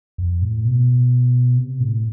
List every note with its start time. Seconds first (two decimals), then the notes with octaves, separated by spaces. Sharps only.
0.18 F2
0.42 A2
0.65 B2
1.57 C3
1.80 A2